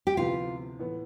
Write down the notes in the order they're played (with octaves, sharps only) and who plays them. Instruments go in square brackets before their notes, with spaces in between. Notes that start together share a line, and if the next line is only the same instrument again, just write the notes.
[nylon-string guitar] G4
[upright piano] D2 C3 F3 B3 E4 [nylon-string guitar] F4
[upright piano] A2 E3 B3